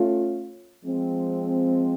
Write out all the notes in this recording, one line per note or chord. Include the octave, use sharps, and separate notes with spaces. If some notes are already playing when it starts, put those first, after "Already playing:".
Already playing: A3 C#4 F4
F3 G#3 C4